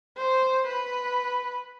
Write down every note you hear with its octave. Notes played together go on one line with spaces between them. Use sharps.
C5
B4